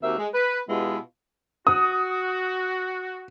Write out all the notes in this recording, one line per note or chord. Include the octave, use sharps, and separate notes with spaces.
D#2 C4 F#4 G4 A#4 E5
G#3
B4
B2 G#3 B3 E4 F4 G4
F#4 D#6